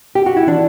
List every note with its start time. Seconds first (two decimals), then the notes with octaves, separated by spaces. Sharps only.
0.15 G4
0.26 F#4
0.37 E4
0.47 E3 D4